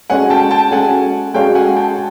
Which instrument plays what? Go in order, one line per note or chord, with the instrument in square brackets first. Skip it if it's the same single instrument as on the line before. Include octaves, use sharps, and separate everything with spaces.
[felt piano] G#3 C#4 F#4 A4 C#5 [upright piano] F#5 G#5
[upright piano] G5 A5
G5 A5
[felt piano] G#3 C#4 F#4 A4 C#5 [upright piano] F#5 G#5
[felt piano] G#3 C#4 F#4 A4 C#5 [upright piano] F5 G5
[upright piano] F#5 G#5
G5 A5